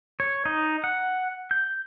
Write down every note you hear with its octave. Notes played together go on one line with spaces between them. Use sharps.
C#5
D#4
F#5
G6